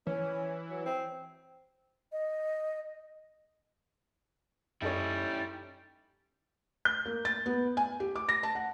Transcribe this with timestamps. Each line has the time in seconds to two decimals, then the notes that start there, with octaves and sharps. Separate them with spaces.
0.07 E3 C#4
0.70 F#3
0.86 C4
2.12 D#5
4.82 F#2 G3 C#4 D#4 E4 A4 C#5
6.85 G6
7.06 A#3
7.25 A6
7.46 B3
7.77 G#5
8.00 G4
8.16 D6
8.29 A#6
8.43 A5
8.55 F#5